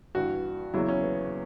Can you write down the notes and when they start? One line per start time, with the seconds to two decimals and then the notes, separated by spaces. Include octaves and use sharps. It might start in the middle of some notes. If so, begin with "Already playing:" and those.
0.15 G2 E3 F#4
0.74 E2 C#3 F#3 E4
0.88 C#4
1.03 B3